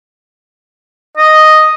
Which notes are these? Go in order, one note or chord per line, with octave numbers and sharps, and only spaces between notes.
D#5